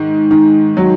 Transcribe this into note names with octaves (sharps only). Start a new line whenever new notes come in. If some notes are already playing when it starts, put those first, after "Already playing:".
Already playing: G#2 D#3
D#3
F#3